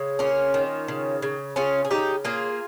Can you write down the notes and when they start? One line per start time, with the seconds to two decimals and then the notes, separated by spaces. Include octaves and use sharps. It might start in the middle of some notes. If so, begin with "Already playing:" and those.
Already playing: C#3 G#3
0.19 A#3 C#4 F4
0.54 D#3
0.88 C#3
1.22 C#3
1.56 C#3 C#4 F4
1.85 G#4
1.91 C#3 D#4 G4
2.24 A#3 F4 G#4